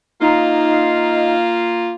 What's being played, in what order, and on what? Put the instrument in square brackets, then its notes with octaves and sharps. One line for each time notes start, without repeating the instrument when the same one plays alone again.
[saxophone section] A#3 F4 [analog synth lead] D#4